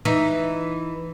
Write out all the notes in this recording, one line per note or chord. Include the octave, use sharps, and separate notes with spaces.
E3 D#4